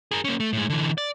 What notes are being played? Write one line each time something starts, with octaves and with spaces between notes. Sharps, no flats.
G#4 A#4
A#3 C#4
A3
A2 G#3
D3 E3
D5